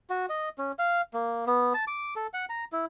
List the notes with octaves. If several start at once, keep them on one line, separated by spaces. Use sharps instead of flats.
F#4
D#5
C#4
F5
A#3
B3
A5
D6
A4
F#5
A#5
E4